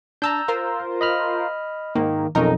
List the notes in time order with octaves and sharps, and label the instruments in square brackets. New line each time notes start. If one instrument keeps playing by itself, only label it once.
[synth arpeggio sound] D4 A5 [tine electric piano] A#5 E6 G6
[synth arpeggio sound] F4 A#4 C5
[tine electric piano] D#5 B5 F6
[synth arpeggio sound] G#2 A#3 [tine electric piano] D#3
[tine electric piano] B1 F2 D#4 [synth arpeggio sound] C#4 A#4